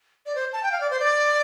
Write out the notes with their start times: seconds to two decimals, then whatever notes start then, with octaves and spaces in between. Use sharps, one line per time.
0.26 D5
0.35 C5
0.53 A5
0.63 G5
0.72 F5
0.80 D5
0.90 C5
0.99 D5